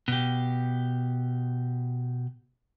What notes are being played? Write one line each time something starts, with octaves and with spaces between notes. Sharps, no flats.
B2 G4